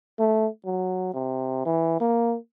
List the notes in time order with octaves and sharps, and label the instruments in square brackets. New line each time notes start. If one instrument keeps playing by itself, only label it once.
[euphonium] A3
F#3
C3
E3
A#3